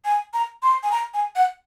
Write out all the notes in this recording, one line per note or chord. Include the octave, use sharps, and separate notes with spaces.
G#5
A#5
C6
G#5
A#5
G#5
F#5